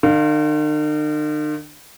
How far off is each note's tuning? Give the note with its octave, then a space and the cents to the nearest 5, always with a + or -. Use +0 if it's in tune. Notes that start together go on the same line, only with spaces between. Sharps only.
D#3 -45 F5 +0